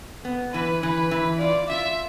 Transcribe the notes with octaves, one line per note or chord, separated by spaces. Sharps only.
B3
E3 B4
E3 B4
E3
F4 D5
F4 E5